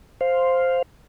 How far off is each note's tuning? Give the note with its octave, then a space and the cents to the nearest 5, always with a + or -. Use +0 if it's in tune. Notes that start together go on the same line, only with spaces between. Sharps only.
C5 +0 F5 +0